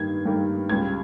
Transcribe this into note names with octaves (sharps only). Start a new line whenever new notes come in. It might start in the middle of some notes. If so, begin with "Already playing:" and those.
Already playing: G2 D#3 G3 A#3 G#6
G2 D#3 G3 A#3
C#2 C#3 G3 G#6